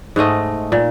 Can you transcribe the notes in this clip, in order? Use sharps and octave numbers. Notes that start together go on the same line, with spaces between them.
G#2 G#3 A3 D#5
A#2